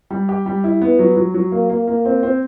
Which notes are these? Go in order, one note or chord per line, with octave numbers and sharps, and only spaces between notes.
G3
G4
G3
E4
B3
F#3
F#3
F#3
A#3
A#3
A#3
C4
C4